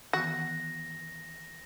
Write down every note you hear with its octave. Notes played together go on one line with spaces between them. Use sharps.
D#3 E3 B3 F#4 A#6